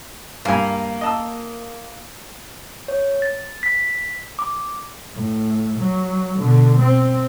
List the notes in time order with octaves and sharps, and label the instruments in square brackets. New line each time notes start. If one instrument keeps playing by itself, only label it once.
[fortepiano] G2 G#5 [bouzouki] A#3
[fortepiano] D#5 A5 E6
[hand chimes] C#5
A6
B6
D6
[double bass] A2
F#3
B2 D3
C4